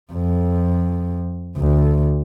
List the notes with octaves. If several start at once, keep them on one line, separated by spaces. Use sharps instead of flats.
F2
D2